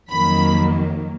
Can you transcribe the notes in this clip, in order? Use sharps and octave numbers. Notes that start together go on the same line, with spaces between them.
F2 D#3 F#3 A#3 B5